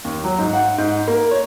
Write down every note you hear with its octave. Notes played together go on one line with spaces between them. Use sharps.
D#2
F#3
G#2
F#5
G#2
A#3
C#5